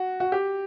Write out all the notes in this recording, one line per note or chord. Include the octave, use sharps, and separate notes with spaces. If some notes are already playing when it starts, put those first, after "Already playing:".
Already playing: F#4
F#4
G4